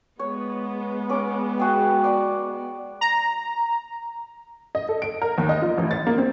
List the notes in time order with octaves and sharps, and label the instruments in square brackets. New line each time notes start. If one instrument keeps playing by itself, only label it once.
[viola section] G#3 B3 [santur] C#5
[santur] C#4 D6
F#4 G#4 G5
D5 F#5 A5
[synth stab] A#5
[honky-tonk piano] D#5
A4
D7
A#4
D#2
D#5
F4
A1
A6
A#3
C4